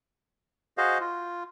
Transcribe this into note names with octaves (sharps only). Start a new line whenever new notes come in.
F#4 G#4 C5 D#5 F5
F4